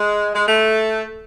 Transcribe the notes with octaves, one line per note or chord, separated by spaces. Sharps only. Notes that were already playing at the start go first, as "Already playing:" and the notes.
Already playing: G#3
G#3
A3